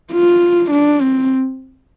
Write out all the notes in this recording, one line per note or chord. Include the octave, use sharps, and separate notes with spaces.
F4
D4
C4